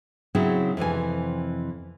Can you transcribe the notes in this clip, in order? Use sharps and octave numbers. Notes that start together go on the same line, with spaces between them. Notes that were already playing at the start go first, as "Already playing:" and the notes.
C#3 F#3 C4 D#4 E4 G#4
F2 C3 E3 G#5